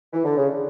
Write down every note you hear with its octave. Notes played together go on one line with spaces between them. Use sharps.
E3
D3
C#3
D3